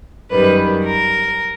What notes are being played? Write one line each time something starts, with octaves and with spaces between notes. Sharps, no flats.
F#2 D#3 G3 B4
A#4